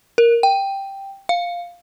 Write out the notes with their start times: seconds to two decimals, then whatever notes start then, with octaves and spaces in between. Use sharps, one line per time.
0.18 A#4
0.43 G5
1.29 F5